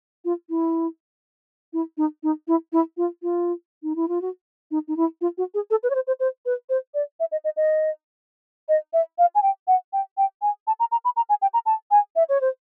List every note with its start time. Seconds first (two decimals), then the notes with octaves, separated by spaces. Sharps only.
0.25 F4
0.50 E4
1.73 E4
1.98 D#4
2.23 D#4
2.48 E4
2.73 E4
2.97 F4
3.23 F4
3.83 D#4
3.96 E4
4.08 F4
4.22 F#4
4.71 D#4
4.88 D#4
4.97 E4
5.21 F4
5.38 F#4
5.54 G#4
5.71 A4
5.83 B4
5.90 C#5
5.95 C5
6.07 C5
6.20 C5
6.46 B4
6.70 C5
6.94 D5
7.20 E5
7.32 D#5
7.44 D#5
7.57 D#5
8.69 D#5
8.93 E5
9.18 F5
9.35 G#5
9.43 G5
9.68 F#5
9.93 G5
10.18 G5
10.42 G#5
10.67 A5
10.80 A#5
10.92 A#5
11.05 B5
11.16 A#5
11.29 G#5
11.42 G5
11.54 A#5
11.66 A5
11.91 G#5
12.16 E5
12.29 C#5
12.41 C5